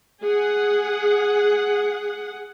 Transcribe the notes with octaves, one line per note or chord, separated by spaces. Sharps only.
G#4 F#5